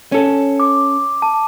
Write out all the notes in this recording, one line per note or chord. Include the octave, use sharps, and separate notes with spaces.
C#4 A4
D6
A5